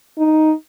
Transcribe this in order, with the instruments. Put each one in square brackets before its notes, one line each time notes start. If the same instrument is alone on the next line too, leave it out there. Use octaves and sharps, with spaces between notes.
[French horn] D#4